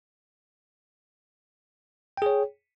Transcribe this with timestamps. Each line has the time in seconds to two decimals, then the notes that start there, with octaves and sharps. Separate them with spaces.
2.17 G5
2.22 G#4
2.26 C#5